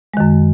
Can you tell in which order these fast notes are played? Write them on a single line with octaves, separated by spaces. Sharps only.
G#3 D#3 F#2